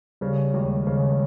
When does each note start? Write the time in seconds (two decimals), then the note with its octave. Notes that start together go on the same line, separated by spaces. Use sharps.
0.21 C#3 G3
0.54 D#2 G#3
0.87 C#3 G#3